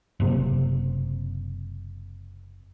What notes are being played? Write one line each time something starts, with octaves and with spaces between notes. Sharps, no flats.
F#1 C3